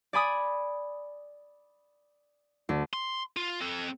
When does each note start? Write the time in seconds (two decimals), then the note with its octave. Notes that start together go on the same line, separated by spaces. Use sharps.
0.13 D5 G#5 B5 D#6
2.69 D2
2.93 C6
3.36 F4
3.61 C4 A4